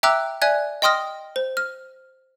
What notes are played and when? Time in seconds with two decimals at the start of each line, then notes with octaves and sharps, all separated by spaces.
0.03 E5 G5 A#5 D6 E6 F#6
0.42 D5 E5 G#5 F#6 G#6
0.82 D#5 G5 C6 D#6 F6 A#6
1.36 C5
1.57 F6